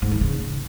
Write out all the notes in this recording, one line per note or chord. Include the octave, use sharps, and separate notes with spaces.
G#2
D#3
C#3